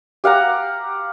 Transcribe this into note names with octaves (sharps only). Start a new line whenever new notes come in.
G4 F5 F#5 A#5